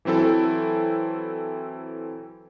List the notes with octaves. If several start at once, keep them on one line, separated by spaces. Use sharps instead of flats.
E3 F#3 C4 E4 A4